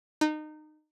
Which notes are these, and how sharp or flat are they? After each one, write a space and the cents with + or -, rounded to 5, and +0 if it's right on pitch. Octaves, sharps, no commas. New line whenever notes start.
D#4 -25